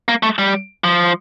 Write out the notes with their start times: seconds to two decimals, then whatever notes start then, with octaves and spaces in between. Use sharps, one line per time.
0.08 A#3
0.23 A3
0.38 G3
0.84 F3